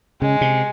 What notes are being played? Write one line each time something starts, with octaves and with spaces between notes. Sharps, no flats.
C#3 G#3
C3